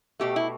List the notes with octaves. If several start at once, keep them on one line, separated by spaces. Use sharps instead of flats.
B2 A3 G4
E4